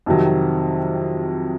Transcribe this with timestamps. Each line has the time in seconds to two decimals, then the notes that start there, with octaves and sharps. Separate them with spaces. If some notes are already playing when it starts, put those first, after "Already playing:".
0.06 F2 C3 D#3 F#3